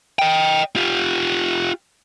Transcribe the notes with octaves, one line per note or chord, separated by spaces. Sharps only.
D#5 G5
F4 G4